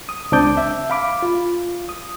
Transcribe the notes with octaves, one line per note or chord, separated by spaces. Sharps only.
D#6
C#2 C4 D4 A5 D6 G6
E5
F5 B5 D6
F4
D#6